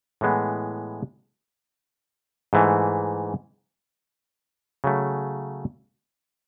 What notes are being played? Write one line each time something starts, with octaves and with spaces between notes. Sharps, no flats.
A2 E3 G#3 B3
G#2 E3 A3
C#3 F#3 A3